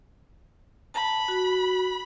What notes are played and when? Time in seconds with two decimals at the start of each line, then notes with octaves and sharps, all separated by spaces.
0.94 A5 B5
1.28 F#4